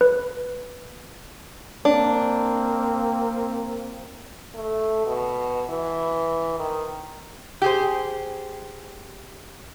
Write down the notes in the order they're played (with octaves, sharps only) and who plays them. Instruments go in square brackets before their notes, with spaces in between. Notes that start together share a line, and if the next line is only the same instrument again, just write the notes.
[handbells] B4
[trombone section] A#3 C4 [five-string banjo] D4
[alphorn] A3
B2
E3
D#3
[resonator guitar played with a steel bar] G4 G#4 C5